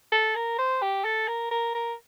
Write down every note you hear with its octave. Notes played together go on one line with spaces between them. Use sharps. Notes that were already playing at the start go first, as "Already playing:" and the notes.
A4
A#4
C5
G4
A4
A#4
A#4
A#4